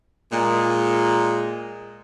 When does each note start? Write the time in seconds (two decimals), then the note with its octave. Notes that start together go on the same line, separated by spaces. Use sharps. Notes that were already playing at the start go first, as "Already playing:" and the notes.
0.32 A#2 G#3